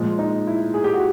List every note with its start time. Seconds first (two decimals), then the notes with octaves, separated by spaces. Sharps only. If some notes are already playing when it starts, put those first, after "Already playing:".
Already playing: A#2 F3 G#3
0.19 D#4
0.47 E4
0.74 G#4
0.84 G4
0.94 F#4